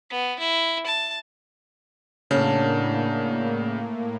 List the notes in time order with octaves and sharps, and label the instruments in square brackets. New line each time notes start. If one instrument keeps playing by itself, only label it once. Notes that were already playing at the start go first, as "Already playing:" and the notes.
[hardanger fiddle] B3
E4
A5
[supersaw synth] A2 A#3 [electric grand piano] C#3 [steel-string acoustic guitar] C#4 D4 F#4